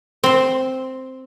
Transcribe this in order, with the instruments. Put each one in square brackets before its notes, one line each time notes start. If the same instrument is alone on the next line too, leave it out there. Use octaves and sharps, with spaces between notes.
[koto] C4 C5